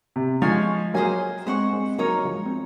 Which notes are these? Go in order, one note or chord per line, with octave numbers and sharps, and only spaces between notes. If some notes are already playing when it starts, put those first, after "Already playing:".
C3
F3 G#3 C#5 G#5 C6
F#3 A#3 G#4 C5 F5 G#5
G#3 C4 C5 F#5 C#6
G#3 C4
F#3 A#3 D#4 A#4 C#5
F#3
F3 G#3
C4